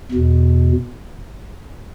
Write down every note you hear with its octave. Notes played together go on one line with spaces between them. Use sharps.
E2 B2